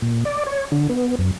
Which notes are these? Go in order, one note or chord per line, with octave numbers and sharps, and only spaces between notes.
A#2
D5
C#5
D3
B3
F#2